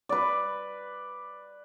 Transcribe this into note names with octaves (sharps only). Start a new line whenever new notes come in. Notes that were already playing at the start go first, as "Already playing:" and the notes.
B4 D5